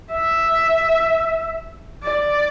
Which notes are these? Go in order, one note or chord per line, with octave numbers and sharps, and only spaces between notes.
E5
D5